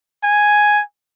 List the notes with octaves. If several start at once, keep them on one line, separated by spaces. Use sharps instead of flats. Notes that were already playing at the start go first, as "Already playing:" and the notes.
G#5